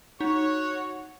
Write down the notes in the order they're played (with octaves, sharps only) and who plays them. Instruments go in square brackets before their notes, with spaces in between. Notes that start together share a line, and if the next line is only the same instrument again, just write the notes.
[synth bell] D#4 [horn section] F#4 C#5